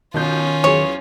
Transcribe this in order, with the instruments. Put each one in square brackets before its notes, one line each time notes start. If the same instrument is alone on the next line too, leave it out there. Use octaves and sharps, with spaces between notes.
[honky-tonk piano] B1 B2 G6 [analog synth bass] D#3 [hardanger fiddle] C#4 F4
[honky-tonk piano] E2 F#3 G#4 [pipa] C#5